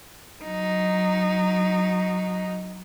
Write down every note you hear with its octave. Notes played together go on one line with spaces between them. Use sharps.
F#3 D#4